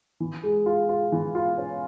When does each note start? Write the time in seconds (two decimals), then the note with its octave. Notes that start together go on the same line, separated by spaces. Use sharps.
0.20 E3
0.43 G#3
0.66 F4
0.89 F4
1.12 E3
1.35 F4
1.58 C#4